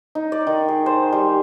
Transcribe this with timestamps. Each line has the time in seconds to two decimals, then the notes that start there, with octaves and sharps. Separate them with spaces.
0.15 D#4
0.32 D5
0.47 D#3
0.68 G#4
0.86 C5
1.12 G3